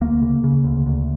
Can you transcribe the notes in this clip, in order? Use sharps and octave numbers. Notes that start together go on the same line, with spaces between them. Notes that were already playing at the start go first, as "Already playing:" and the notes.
D2 A#3
C#3
C#3
D2
D2